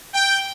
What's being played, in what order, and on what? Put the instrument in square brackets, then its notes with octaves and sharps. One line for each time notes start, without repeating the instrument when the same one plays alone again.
[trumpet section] G5